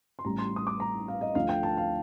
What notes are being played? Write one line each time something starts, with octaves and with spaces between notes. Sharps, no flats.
C6
A1 A2 G3 A#5
C6
D#6
D6
A#5
F5
D#5
D2 D3 F3 F5
G5
A5
F5